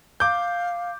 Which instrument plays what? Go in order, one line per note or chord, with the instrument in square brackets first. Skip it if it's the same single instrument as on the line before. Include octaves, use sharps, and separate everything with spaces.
[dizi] F5 [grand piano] D6 G6